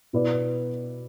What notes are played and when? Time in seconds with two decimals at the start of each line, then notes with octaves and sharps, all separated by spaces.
0.13 B2 B3 E4 B4 D5